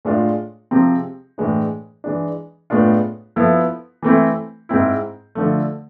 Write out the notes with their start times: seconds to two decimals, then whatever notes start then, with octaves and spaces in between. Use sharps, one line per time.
0.05 A2 G#3 D4 F4
0.71 C3 F3 G#3 C4
1.38 A2 E3 G#3 D4
2.04 E3 G#3 D4
2.70 A2 G#3 B3 D4 F4
3.36 F3 B3 E4 A4
4.02 E3 A3 C4 E4
4.69 G#2 G#3 C4 E4
5.35 D3 F3 A3